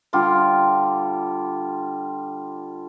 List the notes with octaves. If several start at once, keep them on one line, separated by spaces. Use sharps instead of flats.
D3 G3 F4 D5